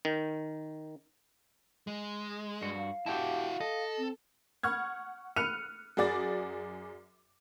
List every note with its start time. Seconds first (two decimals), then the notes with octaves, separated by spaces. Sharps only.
0.05 D#3
1.87 G#3
2.62 G2 F#4
2.76 F5
3.06 E4 F#4 G4 G5 A5
3.60 A4 D#5
3.98 C4
4.63 F#5 C#6 F6 G#6
5.36 F6 F#6 C#7 D#7 F7
5.97 F#2 F#4 G#4 D5 D6 A6